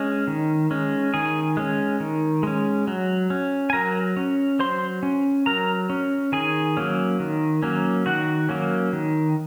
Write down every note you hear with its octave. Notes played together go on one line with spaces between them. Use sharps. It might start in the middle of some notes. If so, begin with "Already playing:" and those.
Already playing: G#3 C#4
D#3
G#3 C#4
D#3 G#4 G#5
G#3 C#4
D#3
G#3 C#4
F#3
C#4
G#5
F#3 A#4 A#5
C#4
F#3 C5 C6
C#4
F#3 A#4 A#5
C#4
D#3 G#4 G#5
F#3 A#3 C#4
D#3
F#3 A#3 C#4
D#3 F#4 F#5
F#3 A#3 C#4
D#3